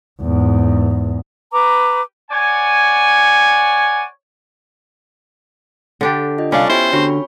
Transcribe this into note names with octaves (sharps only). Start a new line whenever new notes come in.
E2 G#2
B4 A#5 D6
C#5 D5 F#5 G#5
D3 D4 G4
F4 D#5
C2 C#4 D4 F5 B5 C#6 A6
B3 E4 G4 C5 G5
D3 F#4 C#5 B5 C#6